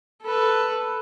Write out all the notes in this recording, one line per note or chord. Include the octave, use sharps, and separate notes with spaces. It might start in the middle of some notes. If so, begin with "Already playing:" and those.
A4 B4